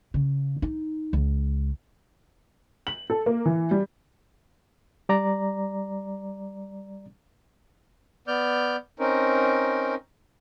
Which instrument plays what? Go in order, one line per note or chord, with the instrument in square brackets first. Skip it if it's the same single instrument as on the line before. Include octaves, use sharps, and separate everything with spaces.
[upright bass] C#3
D#4
C#2
[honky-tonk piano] F#7
A4
A#3
E3
G3
[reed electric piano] G3 D5 A#5
[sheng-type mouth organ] B3 D5 F6 G6
C4 C#4 D#4 A#4